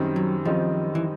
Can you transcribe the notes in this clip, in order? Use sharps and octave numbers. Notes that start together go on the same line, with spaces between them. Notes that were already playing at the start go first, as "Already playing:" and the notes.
Already playing: F#2 D#3 G3 C4 D#4
F#3
F#2 D#3 F3 G3 C4 D#4
E3